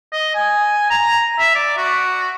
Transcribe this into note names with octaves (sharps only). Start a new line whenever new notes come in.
D#5
G#5
A#5
E5
D5
F#4